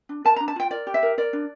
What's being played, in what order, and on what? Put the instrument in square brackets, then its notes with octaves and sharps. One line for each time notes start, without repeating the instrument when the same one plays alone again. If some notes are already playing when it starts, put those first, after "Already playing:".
[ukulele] D4
A#4 A5
A#5
D4
A5
F4 G5
A#4 D5
G4
E5
A#4
A#4 D5
D4